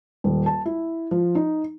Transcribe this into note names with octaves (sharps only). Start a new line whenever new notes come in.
D#1
A5
E4
F3
D#4